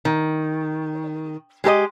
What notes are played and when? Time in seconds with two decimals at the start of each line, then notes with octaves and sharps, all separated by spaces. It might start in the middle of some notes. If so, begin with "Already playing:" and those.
0.05 D#3
1.64 G#3 G4 A4 D#5